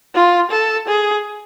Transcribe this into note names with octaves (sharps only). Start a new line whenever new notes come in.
F4
A4
G#4